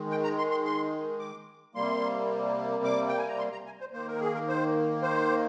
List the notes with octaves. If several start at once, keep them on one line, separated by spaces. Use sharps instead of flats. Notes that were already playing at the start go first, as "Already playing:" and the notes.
Already playing: D#3 G#3
G5
A#5
C6
C6
C6
D6
C3 G3 A#3 C6
D6
G5
G#5
A#5
C6
A#5
G#5
C5
D#3 A#3 C5
A#4
G#4
A#4
C5
C5